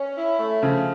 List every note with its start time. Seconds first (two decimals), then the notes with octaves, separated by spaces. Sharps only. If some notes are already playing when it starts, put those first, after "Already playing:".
Already playing: C#4
0.17 E4
0.39 A3
0.62 C#3 F3